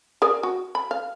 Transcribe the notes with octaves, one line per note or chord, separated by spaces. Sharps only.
G#4 A#4 D5
F#4
B5
F5